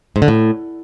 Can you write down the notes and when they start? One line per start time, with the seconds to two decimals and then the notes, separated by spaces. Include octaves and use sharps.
0.16 G#2
0.22 D3
0.28 A2